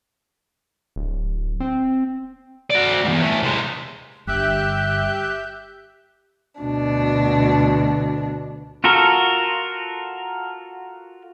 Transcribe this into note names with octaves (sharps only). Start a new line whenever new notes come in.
D1
C4
F#4 D5
E2 G#2
E3 A3
C3 G#3
G1 G2 G4 E5 F#6 G6
D2 B2 D4
F4 F#4 A4 A#4